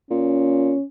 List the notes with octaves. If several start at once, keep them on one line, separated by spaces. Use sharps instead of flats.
A#2 C#4